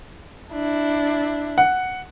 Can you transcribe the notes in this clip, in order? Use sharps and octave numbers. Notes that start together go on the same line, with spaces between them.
D4 E4
F#5